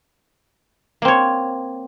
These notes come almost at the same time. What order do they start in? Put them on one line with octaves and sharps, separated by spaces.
A#3 C4 C#5